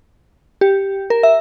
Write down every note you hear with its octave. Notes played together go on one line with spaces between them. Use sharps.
G4
A#4
E5